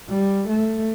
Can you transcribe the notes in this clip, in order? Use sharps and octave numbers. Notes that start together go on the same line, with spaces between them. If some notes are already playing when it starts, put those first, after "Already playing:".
G3
A3